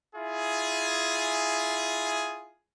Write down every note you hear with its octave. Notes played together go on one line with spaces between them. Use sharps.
E4 F4 G#4